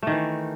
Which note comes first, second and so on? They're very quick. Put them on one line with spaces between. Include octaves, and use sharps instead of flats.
A3 D#3 E3